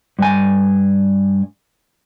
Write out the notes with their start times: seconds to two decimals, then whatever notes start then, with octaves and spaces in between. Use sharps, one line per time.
0.19 G2 G#5